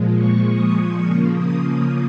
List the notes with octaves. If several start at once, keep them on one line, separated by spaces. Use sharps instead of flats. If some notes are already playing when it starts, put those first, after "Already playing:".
Already playing: A#2 F3 G#3
C#6
D#6
C#6
C#3 F3 A#3 C#6
D#6
D#6